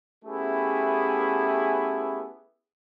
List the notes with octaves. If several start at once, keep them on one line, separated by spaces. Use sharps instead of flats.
A3 B3 C#4 E4 G4 G#4